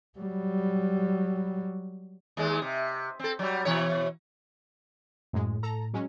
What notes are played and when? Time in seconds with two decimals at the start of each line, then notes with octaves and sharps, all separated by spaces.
0.18 F#3 G3
2.37 D#2 G#3
2.62 C3
3.19 C4 A4
3.39 F#3 G3
3.65 B2 E3 C#5
5.33 F#2 A2 G#3
5.63 A4 A#5
5.94 F#3 G#3 C#4